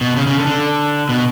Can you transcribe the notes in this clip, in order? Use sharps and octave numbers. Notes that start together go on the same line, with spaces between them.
B2
C#3
C#3
D3
D3
B2